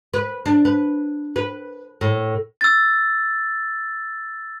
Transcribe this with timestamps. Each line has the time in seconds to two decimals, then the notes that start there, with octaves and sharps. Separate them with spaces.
0.14 B4
0.46 D4
0.65 B4
1.36 B4
2.01 A2
2.61 E6 A6